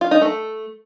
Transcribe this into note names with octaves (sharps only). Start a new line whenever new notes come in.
F4
D#4
A3